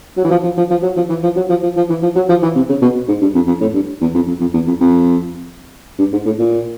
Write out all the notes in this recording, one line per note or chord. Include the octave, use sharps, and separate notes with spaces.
F#3
E3
F3
F3
F3
F3
F#3
F3
E3
F3
F#3
F3
F3
F3
E3
F3
F#3
F3
E3
C3
C#3
B2
G#2
G2
F2
F2
A2
G2
E2
F2
F2
F2
E2
F2
F2
G2
G#2
A2
A#2